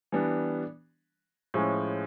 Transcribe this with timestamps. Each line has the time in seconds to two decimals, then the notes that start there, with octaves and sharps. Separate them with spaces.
0.12 E3 G3 B3 D4
1.54 A2 F3 G#3 C#4